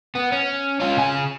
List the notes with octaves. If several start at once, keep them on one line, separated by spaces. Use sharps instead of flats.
B3
C#4
C#4 F4
C#3 G#5